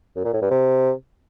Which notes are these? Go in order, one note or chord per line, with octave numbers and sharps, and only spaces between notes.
F#2
A#2
A2
G2
C3